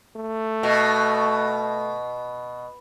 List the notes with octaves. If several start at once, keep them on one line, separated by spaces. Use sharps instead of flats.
A3
B2